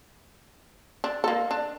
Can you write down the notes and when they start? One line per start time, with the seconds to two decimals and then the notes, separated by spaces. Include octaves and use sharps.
1.04 D4
1.24 A#3 A4
1.51 D4